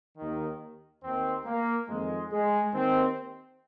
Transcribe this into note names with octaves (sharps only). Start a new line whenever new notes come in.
D#2 D#3
D#2 D#3 C4
A#3
F2 D#3 G#3
G#3
D#2 D#3 C4